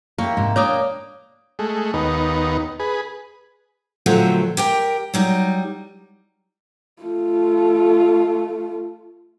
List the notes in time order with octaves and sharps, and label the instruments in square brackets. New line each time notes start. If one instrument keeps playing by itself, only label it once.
[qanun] A#3 [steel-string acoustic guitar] E4 G4 C#5
[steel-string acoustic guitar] G#2 C3 E4
[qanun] A#3 G5 A#5 [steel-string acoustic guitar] D4 [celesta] C#5 D6 D#6
[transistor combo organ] G#3 A3
D#2 B3 D#4
G#4 B4
[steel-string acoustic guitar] A#2 D3 F3 F#3 A3 C4
G4 A#4 G5
F#3 G3 D#4
[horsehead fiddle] A3 F4